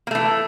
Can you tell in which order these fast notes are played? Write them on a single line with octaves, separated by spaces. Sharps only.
A#3 A3 E3